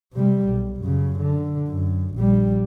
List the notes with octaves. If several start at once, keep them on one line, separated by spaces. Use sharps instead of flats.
C3 G3
B1
F#2 C#3
D3
F#2
A#1 G3